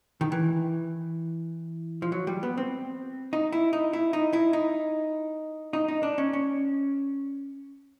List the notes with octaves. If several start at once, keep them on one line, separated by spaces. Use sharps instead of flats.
D#3
E3
F3
F#3
G3
B3
C4
D#4
E4
D#4
E4
D#4
E4
D#4
D#4
D#4
D4
C#4
C#4